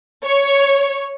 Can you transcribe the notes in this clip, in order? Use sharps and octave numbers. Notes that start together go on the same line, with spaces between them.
C#5